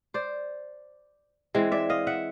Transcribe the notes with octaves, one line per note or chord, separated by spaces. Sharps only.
C5 D5
E3 G#3 C4
D5 E5
D#5 F5
E5 F#5